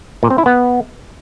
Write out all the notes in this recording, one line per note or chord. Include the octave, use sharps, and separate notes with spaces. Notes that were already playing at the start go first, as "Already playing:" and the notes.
A#2
C4
E4
B3